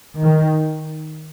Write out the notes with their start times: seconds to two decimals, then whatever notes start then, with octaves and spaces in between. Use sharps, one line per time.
0.20 D#3